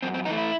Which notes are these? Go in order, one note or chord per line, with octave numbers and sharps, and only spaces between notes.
F#2 C4
C4
E3 A3 D#4
E4